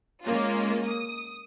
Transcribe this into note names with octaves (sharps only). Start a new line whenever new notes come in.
G#3 A#3 C#4 F4
D#6